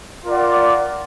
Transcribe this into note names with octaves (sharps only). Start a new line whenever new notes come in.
F4 A#4 D5 F#5